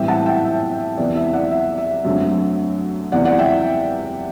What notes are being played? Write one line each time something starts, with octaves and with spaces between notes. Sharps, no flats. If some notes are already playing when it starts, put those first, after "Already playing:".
Already playing: A2 E3 G3 C4 E5 G5
F#5 A5
E5 G5
E5
E5
E2 C3 E3 B3 D5
E5
D5 F#5
E5
E5
F#2 D3 F#3 A3 C4
E2 C3 E3 B3 D5 F#5
D5 F#5
E5 G5